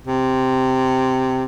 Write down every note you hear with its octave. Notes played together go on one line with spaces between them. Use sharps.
C3